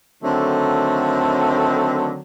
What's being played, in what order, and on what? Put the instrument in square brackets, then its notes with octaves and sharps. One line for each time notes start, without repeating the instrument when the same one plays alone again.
[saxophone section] D3 D#3 F#3 A3 C4